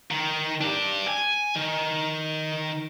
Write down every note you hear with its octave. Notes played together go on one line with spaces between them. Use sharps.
D#3
D4 G4
G#5
D#3